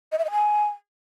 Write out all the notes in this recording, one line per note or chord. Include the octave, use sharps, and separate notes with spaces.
D#5
E5
D#5
G#5